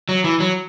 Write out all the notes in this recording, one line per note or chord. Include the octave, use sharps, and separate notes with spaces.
F#3
E3
F#3